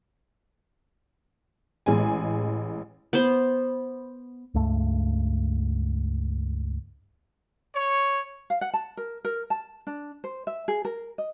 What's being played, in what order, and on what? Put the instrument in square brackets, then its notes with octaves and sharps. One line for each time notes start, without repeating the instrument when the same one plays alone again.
[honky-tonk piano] A1 G#3 G#5
[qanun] B3 C5
[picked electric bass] C#2 G2 A3
[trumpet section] C#5
[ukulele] F5
F#5
A5
A#4
A#4
A5
D4
C5
E5
G#4
A#4
D#5